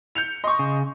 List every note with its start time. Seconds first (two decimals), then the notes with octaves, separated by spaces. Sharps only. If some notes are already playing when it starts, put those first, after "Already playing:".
0.15 G6 C#7 F7
0.44 D#5 C6 C#6
0.59 C#3